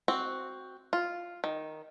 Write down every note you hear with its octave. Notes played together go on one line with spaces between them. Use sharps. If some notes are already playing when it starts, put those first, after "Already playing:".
C4 F#4
F4
D#3